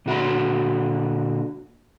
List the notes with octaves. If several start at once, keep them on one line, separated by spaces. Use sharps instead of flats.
A#2 D3 F#4 D5 B5 C6